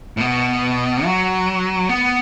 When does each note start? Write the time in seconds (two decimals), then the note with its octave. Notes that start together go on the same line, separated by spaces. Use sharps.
0.17 A2
0.21 B2
1.05 F#3
1.89 B3